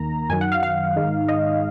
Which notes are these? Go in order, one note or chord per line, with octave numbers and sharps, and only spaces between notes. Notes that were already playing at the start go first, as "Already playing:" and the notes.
Already playing: D#2 D#3 A#3 A#5
F#2 D#3 F#3 G#5
F#5
F5
F5
G#2 D#3 G#3 D#4
D#5